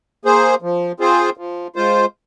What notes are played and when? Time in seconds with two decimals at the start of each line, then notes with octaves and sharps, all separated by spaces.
0.25 A#3 G#4 C5
0.62 F3
1.00 C4 F4 G#4 C5
1.37 F3
1.76 G#3 F4 C5